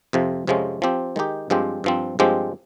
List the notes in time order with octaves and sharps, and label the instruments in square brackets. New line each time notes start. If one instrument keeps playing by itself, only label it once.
[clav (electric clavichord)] F2 C3 F3
F2 C3 F3 G#3 C#4
F3 C4 G4
D#3 G#3 D#4 G4
G2 F3 G#3 C4 G4
G2 F3 C4
G2 F3 G#3 C4 G4